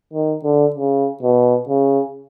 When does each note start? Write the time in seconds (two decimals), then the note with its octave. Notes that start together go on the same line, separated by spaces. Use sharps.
0.13 D#3
0.44 D3
0.76 C#3
1.22 B2
1.69 C#3